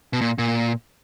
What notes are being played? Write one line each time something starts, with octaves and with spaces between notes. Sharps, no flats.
B2
A#2
A#2